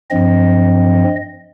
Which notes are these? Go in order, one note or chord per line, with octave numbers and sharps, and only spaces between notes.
G2 F3 C4 D#5